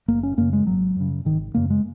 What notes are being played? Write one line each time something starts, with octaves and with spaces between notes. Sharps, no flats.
F#1 A#3
C#4
F#2 C#3 A#3
G#3
G#1 F#3
F#2 C#3
G#1 D#3
F#2 C#3 A#3
G#3